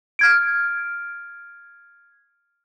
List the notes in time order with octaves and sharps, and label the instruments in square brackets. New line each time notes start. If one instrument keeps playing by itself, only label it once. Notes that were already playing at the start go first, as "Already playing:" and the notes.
[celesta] F6 G#6 D7